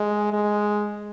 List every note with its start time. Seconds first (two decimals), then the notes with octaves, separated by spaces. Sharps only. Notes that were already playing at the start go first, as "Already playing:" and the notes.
Already playing: G#3
0.33 G#3